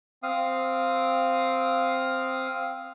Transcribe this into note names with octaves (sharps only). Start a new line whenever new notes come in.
C4 F5 D#6